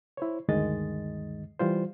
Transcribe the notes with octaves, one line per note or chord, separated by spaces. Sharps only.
E4 C5 C#5
D2 G2 D#3 G#3 D#5 A6
E3 G3 F4 C5